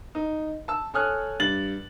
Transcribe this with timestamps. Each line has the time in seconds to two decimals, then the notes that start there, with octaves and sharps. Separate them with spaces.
0.15 D#4
0.68 A5 E6
0.94 A4 C#5 G#5 D#6 F6 F#6
1.40 G2 A6 F#7